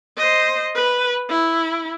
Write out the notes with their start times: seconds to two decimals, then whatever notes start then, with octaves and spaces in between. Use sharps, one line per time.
0.17 C5 D#5
0.75 B4
1.29 E4